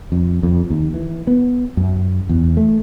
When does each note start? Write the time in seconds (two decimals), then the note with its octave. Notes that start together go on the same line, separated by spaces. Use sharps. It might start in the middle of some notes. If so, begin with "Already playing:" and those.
0.12 F2
0.43 F2
0.70 D#2
0.94 E3
1.27 B3
1.77 F#2
2.29 E2
2.57 A3